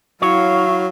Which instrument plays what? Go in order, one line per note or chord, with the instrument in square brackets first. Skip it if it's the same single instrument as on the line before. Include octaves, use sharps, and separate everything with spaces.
[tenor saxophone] F#3 [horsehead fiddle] E4 F5 [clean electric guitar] C#5